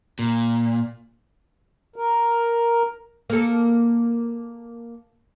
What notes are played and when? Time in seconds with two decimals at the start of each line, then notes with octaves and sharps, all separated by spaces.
0.19 A#2
1.96 A#4
3.30 A#3 A4